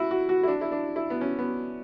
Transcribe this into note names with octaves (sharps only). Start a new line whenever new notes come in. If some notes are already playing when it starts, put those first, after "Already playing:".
Already playing: E4 F#4
F#4
F#4
E4
D4
E4
D4
E4
B3
C#4
B3